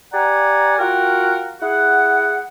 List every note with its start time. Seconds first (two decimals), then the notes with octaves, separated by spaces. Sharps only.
0.13 G4 D5 F#5 G#5 A#5
0.79 F4 F#4 A#4 F#5 G5
1.61 E4 G#4 F#5